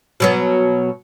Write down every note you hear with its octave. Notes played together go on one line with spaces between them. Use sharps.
B2 F#3 B3